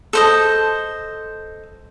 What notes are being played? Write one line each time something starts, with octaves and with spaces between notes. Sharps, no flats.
A4 C5 D#5